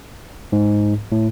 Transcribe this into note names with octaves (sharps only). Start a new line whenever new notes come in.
G#2
A2